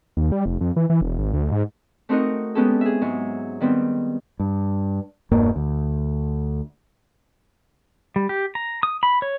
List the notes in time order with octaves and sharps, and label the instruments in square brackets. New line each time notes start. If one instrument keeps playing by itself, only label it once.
[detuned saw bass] D#2
G3
F1
F2
E3
E3
E1
G#1
D2
G#2
[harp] A3 C4 D#4 F#4 A#4 D#5
G#3 B3 C#4 G4 A4
G#4 E5
G#2 F#3
D#3 G3 B3 C4
[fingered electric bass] G2
E1 G2 A#3
D2
[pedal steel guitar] G3
G4
A#5
D#6
B5
C#5